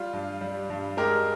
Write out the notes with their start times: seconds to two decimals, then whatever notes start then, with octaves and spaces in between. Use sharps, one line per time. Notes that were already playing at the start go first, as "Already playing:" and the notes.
Already playing: G3 F4
0.13 G2
0.41 G3
0.70 G2
0.97 G#3 G4 A#4